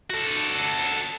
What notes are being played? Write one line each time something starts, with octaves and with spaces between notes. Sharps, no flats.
F#4 A4